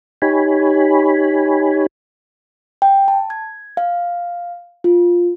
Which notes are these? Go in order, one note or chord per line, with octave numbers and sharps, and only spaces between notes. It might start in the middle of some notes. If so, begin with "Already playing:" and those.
D#4 G4 C#5 G#5 B5
G5
A5
G#6
F5
F4